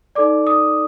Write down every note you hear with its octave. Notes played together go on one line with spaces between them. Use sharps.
D#4 A4 D5 D6
D#6